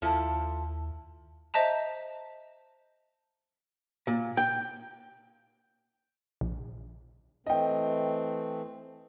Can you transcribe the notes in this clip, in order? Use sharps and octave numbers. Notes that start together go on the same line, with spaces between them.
D#2 F3 E4 A4
C5 D#5 E5 A5 A#5
A#2
G5
A#1
E3 A3 C4 D#5 G5